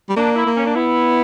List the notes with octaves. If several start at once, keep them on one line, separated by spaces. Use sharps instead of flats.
G3
A#3 D4
E4
A#3
C#4
D4
B3 E4